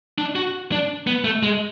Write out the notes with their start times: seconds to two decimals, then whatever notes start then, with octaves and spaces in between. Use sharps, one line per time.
0.18 D4
0.35 F#4
0.72 D4
1.07 B3
1.24 A3
1.43 G#3